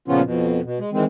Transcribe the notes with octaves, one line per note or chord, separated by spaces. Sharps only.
A#2 C#3 F3 B3 C#4 F4
F2 B2
B2
G#3
D#3 E3 G#3 C4